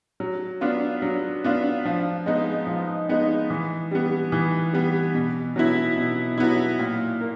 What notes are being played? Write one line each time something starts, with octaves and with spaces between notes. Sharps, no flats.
F#3
B3 D4 F4
F#3
B3 D4 F4
F3
G#3 B3 D#4
F3
G#3 B3 D#4
E3
G3 B3
E3
G3 B3
B2
F#3 B3 E4
B2
F#3 B3 E4
A#2
A#3